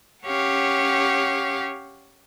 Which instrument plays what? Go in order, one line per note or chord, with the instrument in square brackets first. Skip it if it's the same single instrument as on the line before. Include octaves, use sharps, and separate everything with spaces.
[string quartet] C#4 G4 C#5 F5 F#5